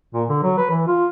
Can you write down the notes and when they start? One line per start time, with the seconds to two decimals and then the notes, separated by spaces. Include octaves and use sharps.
0.14 A#2
0.29 D3
0.43 F#3
0.58 B4
0.70 E3
0.87 F4